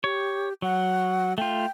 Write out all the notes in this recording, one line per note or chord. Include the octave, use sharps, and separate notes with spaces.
G4 C#5
F#3 F#5
A3 F4 G5